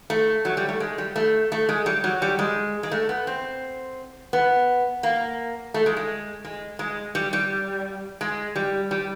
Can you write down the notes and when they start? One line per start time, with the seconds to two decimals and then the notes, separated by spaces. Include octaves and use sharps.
0.10 A3
0.45 F#3
0.57 G3
0.69 A3
0.80 G#3
0.98 G3
1.16 A3
1.52 A3
1.69 G#3
1.86 G3
2.04 F#3
2.22 G3
2.39 G#3
2.83 G#3
2.91 A3
3.09 B3
3.27 C4
4.33 B3
5.03 A#3
5.74 A3
5.86 G#3
5.97 G#3
6.45 G#3
6.79 G#3
7.15 G3
7.33 G3
8.21 G#3
8.56 G3
8.91 G3